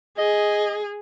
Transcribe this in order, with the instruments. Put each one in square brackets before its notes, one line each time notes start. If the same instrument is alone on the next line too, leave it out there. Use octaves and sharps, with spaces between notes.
[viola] G#4 [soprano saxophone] D#5